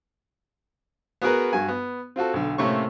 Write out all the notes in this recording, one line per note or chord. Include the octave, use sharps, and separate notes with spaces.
B3 F#4 G#4 A#4 B4
G2 F#4 G#5
B3
C4 F4 F#4 A4
B1 D3
A2 C3 A3 A#3 C#4 C#6